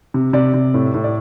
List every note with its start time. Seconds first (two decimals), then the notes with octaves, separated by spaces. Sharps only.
0.14 C3
0.33 C3 D5
0.54 C3
0.74 A2
0.94 A2
1.04 D5